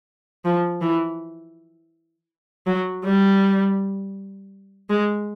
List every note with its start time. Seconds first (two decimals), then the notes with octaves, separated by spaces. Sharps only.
0.45 F3
0.81 E3
2.67 F#3
3.04 G3
4.90 G#3